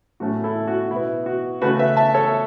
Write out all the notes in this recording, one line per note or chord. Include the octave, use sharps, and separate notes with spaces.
A2 F#3 A3 C#4 F#4
E4 A4
F#4
B2 B3 E4
F#4
C#3 A3 C#4 F#4 B4
B4 E5
E5 A5
A4 C#5